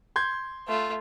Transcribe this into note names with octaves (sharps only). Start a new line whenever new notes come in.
C6 G6 G#6
A3 F4